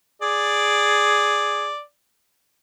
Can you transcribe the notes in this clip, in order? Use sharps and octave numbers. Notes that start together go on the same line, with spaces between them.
G#4 D5